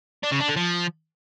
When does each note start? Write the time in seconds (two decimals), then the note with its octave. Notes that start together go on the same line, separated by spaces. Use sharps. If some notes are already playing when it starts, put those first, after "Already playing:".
0.23 D4
0.31 C#3
0.40 D4
0.48 D3
0.56 F3